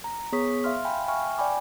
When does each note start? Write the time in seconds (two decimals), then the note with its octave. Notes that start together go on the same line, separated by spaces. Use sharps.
0.04 A#5
0.32 B3 G#4 C#5 C#6 D#6 B6
0.64 E5 F5 C6 F6
0.85 F5 G5 G#5 B5
1.08 E5 G5 G#5 C#6 F6
1.38 D5 G5 G#5 B5 D6